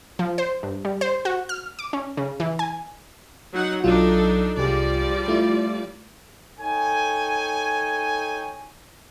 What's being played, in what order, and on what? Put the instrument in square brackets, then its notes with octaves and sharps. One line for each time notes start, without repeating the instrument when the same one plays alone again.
[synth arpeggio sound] F3
C5
G2
G3
C5
F#4
F6
D6
C#4
C#3
E3
G#5
[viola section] F#3 D#4 F#5
[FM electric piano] B1 F#3 F4 [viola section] D4 D#4 A4
[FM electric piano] C2 G4 G#4 [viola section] F3 G3 D5
[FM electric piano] A3 E4 F4
[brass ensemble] D#4 A4 C#5 G5 G#5